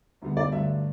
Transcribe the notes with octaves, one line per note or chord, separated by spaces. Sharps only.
D2 D3 G3 B3
D5
G2 D3 F#3 A3 D4 E5